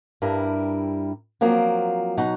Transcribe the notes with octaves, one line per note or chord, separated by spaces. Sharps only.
G2 G3 E4 A#4
F3 F#3 A#3 C4
B2 F#3 D#4 F#5